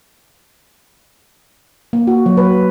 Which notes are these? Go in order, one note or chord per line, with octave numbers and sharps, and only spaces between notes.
A#3
F#4
F#3
B4